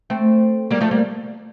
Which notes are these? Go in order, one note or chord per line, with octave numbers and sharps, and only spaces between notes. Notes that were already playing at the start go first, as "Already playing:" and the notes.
A3 C4
G3 A#3
F3 A3
G3 A#3